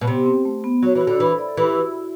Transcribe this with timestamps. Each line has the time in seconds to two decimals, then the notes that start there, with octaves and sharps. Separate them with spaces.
0.01 B2
0.07 C3 B3
0.26 C4
0.45 A3
0.64 B3
0.83 F#3 F#4
0.95 E3
1.01 F#4
1.07 D3 D4
1.20 E3 B4
1.29 C5
1.38 D5
1.48 A4
1.57 E3 G4
1.76 F#4